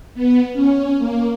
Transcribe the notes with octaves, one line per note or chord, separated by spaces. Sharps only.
B3
C#4
A#3